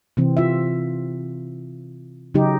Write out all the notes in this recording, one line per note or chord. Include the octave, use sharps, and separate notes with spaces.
C3 E3 C4
F4 E5
C#3 F#3 D#4 G4